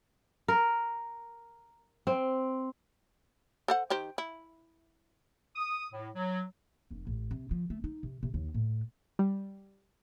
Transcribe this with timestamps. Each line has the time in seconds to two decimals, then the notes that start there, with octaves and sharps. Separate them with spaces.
0.48 A#4
2.07 C4
3.68 A4 C5 F#5
3.90 D#3 G4 C5
4.18 E4
5.56 D#6
5.93 A2
6.15 F#3
6.91 F1
7.07 A1
7.31 C3
7.51 F3
7.70 A3
7.84 D#4
8.03 C3
8.23 C3
8.34 D#2
8.54 A2
9.19 G3